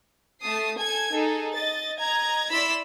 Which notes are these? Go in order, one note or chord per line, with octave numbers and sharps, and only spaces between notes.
A3 A5 D#6 C7
A4 G#5 G#6
D#4 G#4 A4
D#5 A6
D#5 A#5 G#6
E4 D5 B5 C6 E6 B6